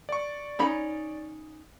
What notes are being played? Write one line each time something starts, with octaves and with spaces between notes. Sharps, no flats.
D5 C#6
C#4 D#4 B5